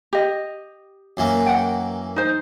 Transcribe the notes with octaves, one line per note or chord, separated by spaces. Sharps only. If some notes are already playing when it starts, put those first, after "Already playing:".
G4 D#5
F#2 E3 A#3
F#5 G5
D#4 C5